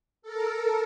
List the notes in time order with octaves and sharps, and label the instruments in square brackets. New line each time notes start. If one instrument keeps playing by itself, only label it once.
[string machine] A4 A#4